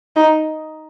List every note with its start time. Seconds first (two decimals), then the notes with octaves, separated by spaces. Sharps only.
0.16 D#4